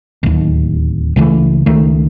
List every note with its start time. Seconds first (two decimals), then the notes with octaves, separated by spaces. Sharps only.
0.23 D1 D#2
1.16 C#2 C#3 E3 A3
1.66 C#2 D#3 A3